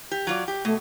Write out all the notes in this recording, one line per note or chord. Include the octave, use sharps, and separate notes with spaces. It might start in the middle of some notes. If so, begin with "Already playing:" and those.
G4
F#3 F4 D5
G4
B2 A3